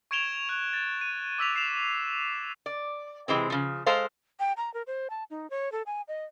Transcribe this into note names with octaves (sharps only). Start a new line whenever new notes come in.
C#6 G#6 D7 E7 F7 G7
F#6 F7
A6
D#7
D6 E6 B6 F7
C7 E7 F7
D5
C3 E3 G#3 C4
C#3 F3
G#3 A4 C5 F5
G5
A#5
A#4
C5
A5
D#4
C#5
A4
G#5
D#5